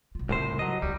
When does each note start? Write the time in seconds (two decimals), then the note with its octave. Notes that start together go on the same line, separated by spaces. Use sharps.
0.15 B1 F4
0.29 C2 A2 C#3 F4 C5
0.59 F#3 D#5
0.82 C#2 G3 C#4